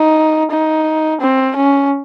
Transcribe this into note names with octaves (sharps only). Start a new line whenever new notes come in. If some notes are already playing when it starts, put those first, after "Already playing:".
Already playing: D#4
D#4
C4
C#4